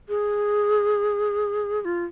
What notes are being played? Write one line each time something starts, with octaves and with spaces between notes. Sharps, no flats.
G#4
G#4
F4